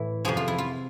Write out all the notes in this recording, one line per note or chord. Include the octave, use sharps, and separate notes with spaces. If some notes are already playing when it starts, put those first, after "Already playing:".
Already playing: A2 E3 E4
F2 C3 F3 G#4
F4
E4
F4